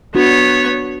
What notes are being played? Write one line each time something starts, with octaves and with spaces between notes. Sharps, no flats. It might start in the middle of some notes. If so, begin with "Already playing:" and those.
B3 D4 F#4 C#5